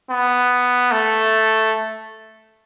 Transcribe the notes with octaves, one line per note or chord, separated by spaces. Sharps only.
B3
A3